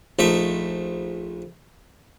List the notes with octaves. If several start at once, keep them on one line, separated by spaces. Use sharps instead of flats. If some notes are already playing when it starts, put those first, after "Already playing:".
A#1 A3 D#4 E5